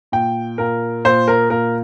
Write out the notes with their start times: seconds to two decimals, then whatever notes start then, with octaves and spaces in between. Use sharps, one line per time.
0.12 A#2 G5
0.58 A#2 A#4
1.04 A#2 C5
1.28 A#4
1.50 A#2 A#4